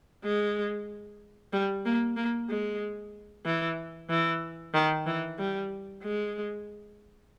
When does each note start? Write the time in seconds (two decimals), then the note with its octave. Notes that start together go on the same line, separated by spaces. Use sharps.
0.24 G#3
1.52 G3
1.85 A#3
2.16 A#3
2.49 G#3
3.45 E3
4.10 E3
4.73 D#3
5.06 E3
5.38 G3
6.03 G#3